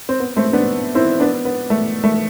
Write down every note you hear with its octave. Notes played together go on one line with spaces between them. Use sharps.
C4
B3
A3 C4
B3 D4
C4 E4
B3 D4
B3
A3
A3